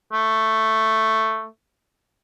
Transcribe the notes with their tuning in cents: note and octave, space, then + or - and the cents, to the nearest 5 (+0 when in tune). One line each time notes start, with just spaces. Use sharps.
A3 +5